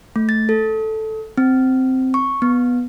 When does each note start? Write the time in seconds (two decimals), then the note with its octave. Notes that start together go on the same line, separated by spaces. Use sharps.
0.16 A3
0.29 A6
0.49 A4
1.37 C4
2.14 C#6
2.42 B3